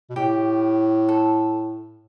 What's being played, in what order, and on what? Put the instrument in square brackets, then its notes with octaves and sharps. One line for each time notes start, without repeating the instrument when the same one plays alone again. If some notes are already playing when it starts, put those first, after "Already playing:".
[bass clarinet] B2
[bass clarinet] A2 [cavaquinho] G4
[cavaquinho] A4